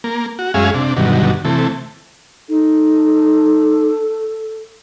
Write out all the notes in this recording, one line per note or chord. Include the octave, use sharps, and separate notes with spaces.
A#3
F#4
F#2 G#3 C#4 G#4 E5 F5
C3 D4
G2 B2 D3 D#3 F#3
C3 E3 A3
D#4 A4